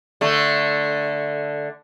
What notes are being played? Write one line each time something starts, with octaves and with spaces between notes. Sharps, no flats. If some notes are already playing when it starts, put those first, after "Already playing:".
D3 A3